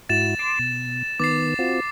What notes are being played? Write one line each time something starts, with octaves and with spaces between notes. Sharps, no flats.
G#2 E4 F#4 A6 E7
C6 D6
B2
D#3 B3 D6 A6 C7
C4 F4 F#4